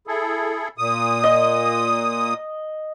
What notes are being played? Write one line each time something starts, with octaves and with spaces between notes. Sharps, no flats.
E4 G#4 A4
A#2 D#6
D#5